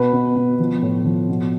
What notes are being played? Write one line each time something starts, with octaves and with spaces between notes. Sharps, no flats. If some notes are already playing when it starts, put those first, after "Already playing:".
Already playing: B2 B4
B2
B2
F3
A2
F3
B2